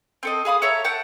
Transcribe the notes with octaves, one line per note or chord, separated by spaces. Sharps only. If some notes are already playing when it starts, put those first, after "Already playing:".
C4 A4 D#5
G#4 F5 B5 D#6
A4 C#5 E5 A#5
F#5 G5 A5